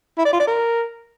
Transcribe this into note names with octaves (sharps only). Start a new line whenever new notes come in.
E4
D5
F4
D5
A#4